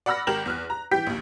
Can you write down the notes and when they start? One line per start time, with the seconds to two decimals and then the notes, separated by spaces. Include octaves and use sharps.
0.06 D5 F#5 B5 E6 F6 A#6
0.27 G#1 G4 A#4 F6 E7 F#7
0.46 E2 F6 F#6
0.70 A#5
0.91 E3 G4 G5 G6 B6
1.06 A#1 D#2